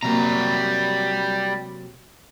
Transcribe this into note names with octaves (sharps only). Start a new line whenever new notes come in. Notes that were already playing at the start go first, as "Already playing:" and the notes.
C3 F#3 G3 A#3 A#5